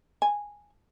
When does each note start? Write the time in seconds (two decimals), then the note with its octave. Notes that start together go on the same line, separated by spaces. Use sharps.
0.22 G#5